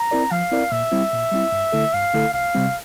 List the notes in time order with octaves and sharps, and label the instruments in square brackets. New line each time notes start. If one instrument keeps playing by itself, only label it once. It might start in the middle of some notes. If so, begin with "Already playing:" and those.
Already playing: [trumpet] A#5
[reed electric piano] C4 E4 A#4 D5
[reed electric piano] F3 [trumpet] F5
[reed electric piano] C4 E4 A#4 D5
[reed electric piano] A#2 [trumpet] E5
[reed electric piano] G3 C4 E4
A#2
G3 C4 E4
G2
D3 A3 E4 A4
[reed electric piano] G2 [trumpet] F5
[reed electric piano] D3 A3 E4 A4
[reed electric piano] C2 [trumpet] F5
[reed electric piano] C3 G3 C4